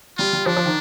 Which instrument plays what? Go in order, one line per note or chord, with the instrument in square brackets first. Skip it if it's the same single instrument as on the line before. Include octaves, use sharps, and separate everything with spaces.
[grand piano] G3 [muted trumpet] F4
[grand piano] G3
[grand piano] F3 [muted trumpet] D4
[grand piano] F3
D#3